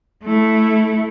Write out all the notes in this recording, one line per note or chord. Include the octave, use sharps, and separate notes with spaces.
A3 E4